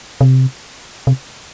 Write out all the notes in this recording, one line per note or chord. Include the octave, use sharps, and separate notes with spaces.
C3
C3